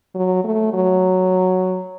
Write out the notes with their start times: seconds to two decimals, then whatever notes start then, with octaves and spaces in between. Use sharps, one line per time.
0.15 F#3
0.44 A3
0.73 F#3